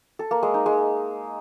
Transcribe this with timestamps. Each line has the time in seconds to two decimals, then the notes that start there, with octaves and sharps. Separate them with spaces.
0.19 A4
0.31 A#3
0.43 G#3
0.54 D#4
0.66 G#3